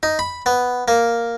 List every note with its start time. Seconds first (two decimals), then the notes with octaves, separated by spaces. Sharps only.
0.03 D#4
0.19 B5
0.46 B3
0.88 A#3